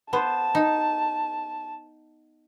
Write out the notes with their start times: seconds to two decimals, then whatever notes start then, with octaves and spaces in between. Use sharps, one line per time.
0.13 B3 C5 A5
0.55 D#4